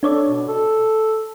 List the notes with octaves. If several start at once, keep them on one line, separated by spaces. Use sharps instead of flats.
D4 A4 C#5 D5
B2
A4